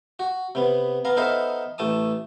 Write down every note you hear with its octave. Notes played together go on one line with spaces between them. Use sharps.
F#4
C3 B3
B3 F5 A#5
B3 D#4 A4 C5 E5 F5
A1 A3 A5 D#6